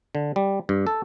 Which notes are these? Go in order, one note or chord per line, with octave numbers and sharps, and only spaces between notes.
D3
G3
G2
A4